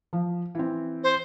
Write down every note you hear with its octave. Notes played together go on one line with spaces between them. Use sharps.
F3
E3 C4
C5